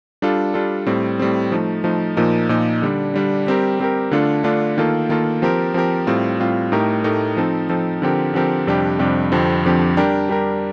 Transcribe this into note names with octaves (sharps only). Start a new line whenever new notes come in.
G3 D4 F4 A4
G3 D4 F4 A4
A2 G3 C4
A2 G3 C4
F3 A3 D#4
F3 A3 D#4
A#2 F3 A#3 D#4
A#2 F3 A#3 D#4
D3 G3 D4
D3 G3 D4
G3 C4 G4 A#4
G3 C4 G4 A#4
D3 A3 D4 F4 A4
D3 A3 D4 F4 A4
D#3 A#3 F4 A4
D#3 A#3 F4 A4
F3 C4 G4 A#4
F3 C4 G4 A#4
A2 G3 C4 F4
A2 G3 C4 F4
A2 A3 D#4 G4 A#4
A2 A3 D#4 G4 A#4
F3 C4 D#4 A4
F3 C4 D#4 A4
D3 F3 C4 G4 A#4
D3 F3 C4 G4 A#4
F2 C3 G3 D4 G4
F2 C3 G3 D4 G4
F2 D3 F3 C4 G4
F2 D3 F3 C4 G4
G3 D4 G4 A#4
G3 D4 G4 A#4